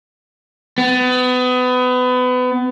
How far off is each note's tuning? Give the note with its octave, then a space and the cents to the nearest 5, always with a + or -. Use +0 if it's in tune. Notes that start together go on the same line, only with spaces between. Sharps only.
B3 +30